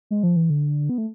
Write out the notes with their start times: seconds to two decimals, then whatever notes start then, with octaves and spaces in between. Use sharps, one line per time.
0.11 G#3
0.23 F3
0.36 E3
0.50 D3
0.89 B3
0.98 A3